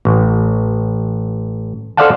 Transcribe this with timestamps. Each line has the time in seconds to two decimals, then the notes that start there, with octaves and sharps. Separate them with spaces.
0.05 A1
1.97 A4 C5 D5 F5 F#5 A5